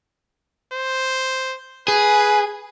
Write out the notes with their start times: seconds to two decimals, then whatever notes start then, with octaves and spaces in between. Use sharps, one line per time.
0.73 C5
1.88 G#4 B4